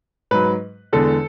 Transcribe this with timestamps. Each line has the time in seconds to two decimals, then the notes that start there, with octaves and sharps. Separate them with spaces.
0.31 G#2 F#3 B4
0.93 E2 D3 G#3 A4